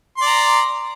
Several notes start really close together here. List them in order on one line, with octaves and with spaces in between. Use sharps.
C6 D5 A#5